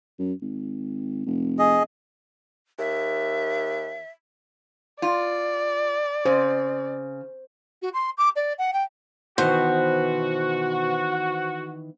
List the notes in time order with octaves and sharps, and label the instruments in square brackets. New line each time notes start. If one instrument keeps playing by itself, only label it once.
[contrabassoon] F#2
G#1
F1
[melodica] G#4 D#5
[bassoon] D#2 [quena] E5
[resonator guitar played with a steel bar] F4 [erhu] D5
[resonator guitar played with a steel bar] C#3 [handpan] C5
[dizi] F#4
C6
D6
D5
F#5
G5
[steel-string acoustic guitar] B2 [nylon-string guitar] D#3 E3 [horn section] F#4 [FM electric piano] C5